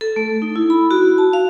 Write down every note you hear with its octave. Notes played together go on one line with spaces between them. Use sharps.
A4
A3
D#4
E4
B5
F#4
A5
F5